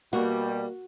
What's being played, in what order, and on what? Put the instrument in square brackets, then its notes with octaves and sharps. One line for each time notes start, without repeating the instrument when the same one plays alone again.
[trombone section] B2 G3 [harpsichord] A#3 [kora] F#4